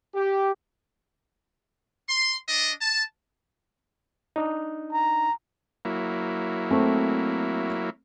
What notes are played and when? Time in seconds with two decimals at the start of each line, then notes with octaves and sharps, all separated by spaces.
0.14 G4
2.08 C6
2.48 D4 D#5
2.80 A5
4.36 D4 D#4
4.92 A#5
5.85 F#3 A#3 E4
6.71 A3 C4